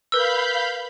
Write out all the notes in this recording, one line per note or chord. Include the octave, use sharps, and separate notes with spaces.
A#4 B4 F5 B5 E6 G6